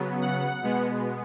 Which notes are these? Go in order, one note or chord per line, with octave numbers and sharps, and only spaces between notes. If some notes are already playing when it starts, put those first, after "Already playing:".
Already playing: C#3 F#3 B3
F#5
B2 G#3 B3